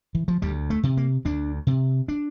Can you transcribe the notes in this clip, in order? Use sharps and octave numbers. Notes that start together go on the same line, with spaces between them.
E3
F3
D2 G3
A3
C3
A#3
D2 D4
C3
D4